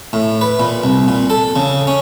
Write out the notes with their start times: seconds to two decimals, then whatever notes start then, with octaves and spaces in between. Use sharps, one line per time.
0.13 A2
0.41 B4
0.60 A#2
0.84 C2
1.08 A#2
1.30 A4
1.56 C#3
1.87 C#4